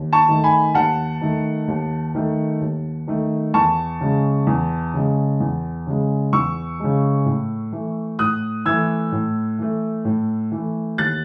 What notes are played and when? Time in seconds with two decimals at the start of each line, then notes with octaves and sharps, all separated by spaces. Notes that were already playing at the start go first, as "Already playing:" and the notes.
Already playing: D#2
0.13 A5 C#6
0.28 D#3 A3
0.44 G#5 B5
0.75 D#2 F#5 A5
1.21 D#3 A3
1.68 D#2
2.15 D#3 A3
2.61 D#2
3.08 D#3 A3
3.54 E2 A5 C#6
4.01 C#3 G#3
4.47 E2
4.94 C#3 G#3
5.40 E2
5.87 C#3 G#3
6.33 E2 C#6 E6
6.80 C#3 G#3
7.26 A2
7.72 E3 A3
8.19 A2 D#6 F#6
8.66 E3 A3 E6 G#6
9.12 A2
9.59 E3 A3
10.05 A2
10.52 E3 A3
10.98 D#2 F#6 A6